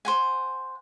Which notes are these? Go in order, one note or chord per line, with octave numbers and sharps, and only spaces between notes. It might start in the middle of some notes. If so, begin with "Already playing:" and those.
C5 F#5 G#5